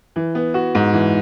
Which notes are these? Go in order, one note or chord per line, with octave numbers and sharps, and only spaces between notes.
E3
B3
F#4
G#2
E3